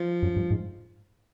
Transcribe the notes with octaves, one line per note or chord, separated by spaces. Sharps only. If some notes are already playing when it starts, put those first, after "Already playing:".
Already playing: F3
F#2
G2
G#2